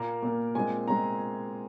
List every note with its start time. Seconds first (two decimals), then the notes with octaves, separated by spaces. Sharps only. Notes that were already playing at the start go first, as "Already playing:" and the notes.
Already playing: A#2 A#3 A#4
0.23 A#2 A#3
0.55 A#2 G#3 C4 G#5
0.87 A#2 G#3 C4 A#5